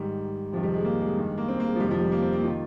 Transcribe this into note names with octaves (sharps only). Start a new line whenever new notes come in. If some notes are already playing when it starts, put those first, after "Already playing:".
Already playing: G#2 D#3 G3
F2 C3 D#3 F3
G3
G#3
A#3
G#3
G2 D#3
A#3
C4
A#3
G#3
F3
F2 C3 D#3 G3
F3
G3
A#3
C4
A#3
D#3 F4